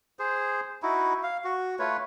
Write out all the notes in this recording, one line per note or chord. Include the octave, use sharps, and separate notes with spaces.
G#4 C5
D#4 E4 F#4
F5
F#4
A3 F4 B4 C#5